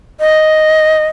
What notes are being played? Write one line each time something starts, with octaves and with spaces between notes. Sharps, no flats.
D#5